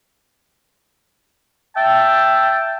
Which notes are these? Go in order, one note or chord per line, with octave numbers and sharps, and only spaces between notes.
E5 G5 A5